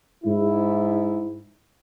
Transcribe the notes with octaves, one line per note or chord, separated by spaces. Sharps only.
G#2 E4